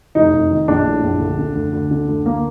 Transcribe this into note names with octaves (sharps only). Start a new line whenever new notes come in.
F1 D#4
F1
D#3
A#1 D4
A2
A#1
D2
D3
D2
D2
D3
D2
A#3